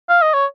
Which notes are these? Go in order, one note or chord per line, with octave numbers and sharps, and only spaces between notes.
F5
D#5
C#5